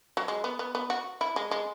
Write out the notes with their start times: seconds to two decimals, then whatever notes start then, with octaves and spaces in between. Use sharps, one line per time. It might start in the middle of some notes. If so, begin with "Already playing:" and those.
0.17 F#3
0.28 G#3
0.44 B3
0.59 B3
0.75 B3
0.90 F#4
1.21 E4
1.36 G#3
1.51 G#3